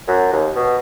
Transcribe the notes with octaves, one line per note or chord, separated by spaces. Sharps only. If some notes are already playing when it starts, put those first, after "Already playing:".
F#2
D#2
B2